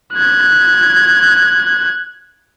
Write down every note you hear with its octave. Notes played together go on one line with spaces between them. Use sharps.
F#6 G#6